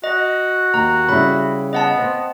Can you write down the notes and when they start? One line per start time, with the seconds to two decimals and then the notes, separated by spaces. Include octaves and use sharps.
0.04 F#4 D#5
0.74 D#2 A#5
1.09 C#3 G3 E4 B5
1.73 B3 D#5 F#5 A5
1.99 C4